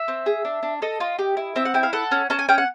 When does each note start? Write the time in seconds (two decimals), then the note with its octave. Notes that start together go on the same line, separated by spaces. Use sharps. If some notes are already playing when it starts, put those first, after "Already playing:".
Already playing: E5
0.08 C4
0.26 G#4
0.45 D4
0.63 D4
0.82 A4 D#5
1.00 F4
1.19 G4
1.37 E4
1.56 C4 E5
1.65 F#5
1.74 E4 G5
1.83 F5
1.93 A4 F#5
2.11 C#4
2.30 C#4 A5
2.39 G#5
2.49 C#4 G5
2.58 F#5